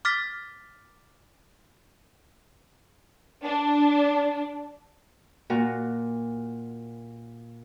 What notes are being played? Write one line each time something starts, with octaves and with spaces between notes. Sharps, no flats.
D6 F6 A6 B6
D4
A#2 F#4 A#4